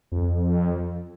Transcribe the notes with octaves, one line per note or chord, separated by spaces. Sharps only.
F2